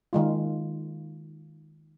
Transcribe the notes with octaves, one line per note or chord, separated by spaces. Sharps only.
D#3 G#3 F4